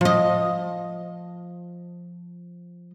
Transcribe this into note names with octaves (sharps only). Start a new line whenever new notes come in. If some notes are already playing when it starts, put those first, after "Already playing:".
F3 D#5